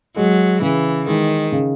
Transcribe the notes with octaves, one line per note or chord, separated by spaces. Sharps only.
F#3 G#3
C#3 E3
D#3 G#3
C#3